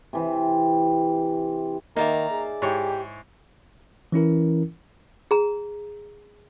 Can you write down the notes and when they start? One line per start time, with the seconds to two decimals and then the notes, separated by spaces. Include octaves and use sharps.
0.13 C3 E3 C4
1.96 D#3 A#3 D#4 D5 E5 A#5
2.31 G#4
2.62 G#2 E4 G4 C#5
4.12 E3 C#4 E4 A#4
5.31 G#4 A#5